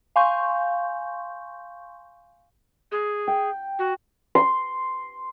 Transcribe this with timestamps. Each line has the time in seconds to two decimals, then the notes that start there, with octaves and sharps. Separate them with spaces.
0.16 F5 G#5 C6 C#6 G6
2.92 G#4
3.27 G5
3.79 F#4
4.35 C6